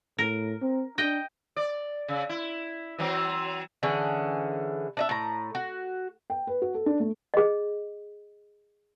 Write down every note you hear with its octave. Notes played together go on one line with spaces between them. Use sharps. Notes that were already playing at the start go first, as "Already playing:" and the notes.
A2 A#4
C4
D4 D#5 G5
D5
C#3
E4
E3 F#3 C4
D3 E3 C#4 G#4
D4 D#5 E5
A2 A#5
F#4
G5
B4
F#4
A4
D4
A3
G#4 D#5